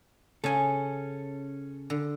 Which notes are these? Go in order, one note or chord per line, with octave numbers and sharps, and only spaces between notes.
C#3 C#4 A4 G#5
D3